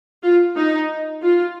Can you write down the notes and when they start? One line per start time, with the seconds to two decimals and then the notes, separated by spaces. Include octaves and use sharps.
0.23 F4
0.56 D#4
1.22 F4